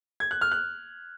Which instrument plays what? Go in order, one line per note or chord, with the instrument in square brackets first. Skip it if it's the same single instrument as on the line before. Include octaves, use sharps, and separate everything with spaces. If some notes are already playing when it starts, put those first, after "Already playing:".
[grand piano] G#6
F#6
F6
F#6